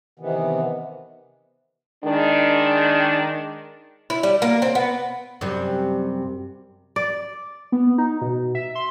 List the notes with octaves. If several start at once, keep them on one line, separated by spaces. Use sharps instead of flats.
C3 D#3 E3 B3
D#3 G#3 D4
E4
G3
A#3
C4
B3
F#2 C3 G3
D5
B3
D#4
B2
E5
C6